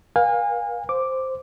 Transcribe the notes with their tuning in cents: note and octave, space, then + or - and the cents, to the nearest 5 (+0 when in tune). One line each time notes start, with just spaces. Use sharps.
B4 -45 F5 +25 G#5 -30
C5 +0 D6 +0